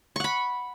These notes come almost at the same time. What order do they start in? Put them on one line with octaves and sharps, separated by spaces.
C#6 F#5 B5